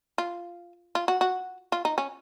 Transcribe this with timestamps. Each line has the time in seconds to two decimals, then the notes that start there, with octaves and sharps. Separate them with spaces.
0.18 F4
0.95 F4
1.08 F#4
1.21 F#4
1.72 F4
1.85 D#4
1.98 C#4